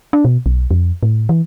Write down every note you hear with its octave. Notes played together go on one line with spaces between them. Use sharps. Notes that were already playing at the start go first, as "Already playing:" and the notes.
D4
B2
B1
F2
A2
E3